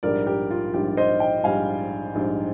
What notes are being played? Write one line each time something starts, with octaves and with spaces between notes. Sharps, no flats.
A#1 G#2 G3 A#4 D5
G4 A#4
F4
A#1 G#2 G3 G4
C5 D#5
D#5 G5
A#1 G#2 G3 F5 G#5
A#1 G#2 G3